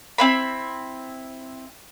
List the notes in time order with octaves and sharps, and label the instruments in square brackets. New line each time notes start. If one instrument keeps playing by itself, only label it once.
[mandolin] C4 E4 B5